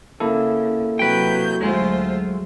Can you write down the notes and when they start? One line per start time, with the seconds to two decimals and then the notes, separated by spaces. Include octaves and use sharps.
0.20 C#3 A#3 E4 A4
0.99 C3 F#3 B4 G5 G6
1.61 D2 F#3 G#3 A3 F4 C5